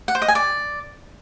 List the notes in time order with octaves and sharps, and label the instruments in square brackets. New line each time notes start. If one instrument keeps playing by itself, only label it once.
[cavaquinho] F#5
C5
D#5
G#5
D5